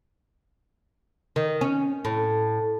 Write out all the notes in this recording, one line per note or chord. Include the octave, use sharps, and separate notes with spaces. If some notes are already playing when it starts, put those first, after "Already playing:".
D#3
C#4
A2